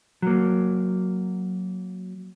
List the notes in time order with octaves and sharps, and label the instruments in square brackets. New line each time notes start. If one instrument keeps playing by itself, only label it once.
[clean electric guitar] F#3 A#3